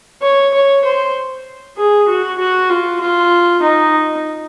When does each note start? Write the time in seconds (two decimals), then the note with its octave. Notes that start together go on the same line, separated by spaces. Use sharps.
0.22 C#5
0.54 C#5
0.84 C5
1.77 G#4
2.08 F#4
2.38 F#4
2.70 F4
3.01 F4
3.62 D#4